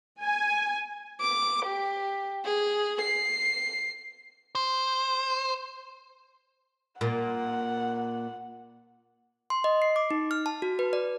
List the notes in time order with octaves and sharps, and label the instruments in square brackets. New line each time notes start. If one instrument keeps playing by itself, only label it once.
[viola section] G#5
[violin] D6
G4
G#4
C7
[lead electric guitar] C5
[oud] A#2 [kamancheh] F#5
[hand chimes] C6
D#5
C7
D6
D#4
F6
A5
F#4
B4
D5